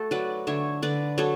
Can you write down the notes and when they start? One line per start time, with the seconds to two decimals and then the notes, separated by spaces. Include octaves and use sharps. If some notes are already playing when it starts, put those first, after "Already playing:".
Already playing: A3 F#4 A4
0.11 F#3 B4 D5
0.47 D3 C#5 E5
0.82 D3 B4 D5
1.18 F#3 A4 C#5